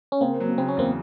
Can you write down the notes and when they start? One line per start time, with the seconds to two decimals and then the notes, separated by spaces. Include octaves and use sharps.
0.12 C#4
0.21 C#3 A#3 C4
0.40 F#3
0.58 C#3 C4
0.68 C#4
0.77 E2 A#3 C4